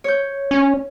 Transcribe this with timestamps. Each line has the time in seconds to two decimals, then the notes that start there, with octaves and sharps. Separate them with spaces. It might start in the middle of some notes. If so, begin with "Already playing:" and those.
0.04 C#5 G6
0.51 C#4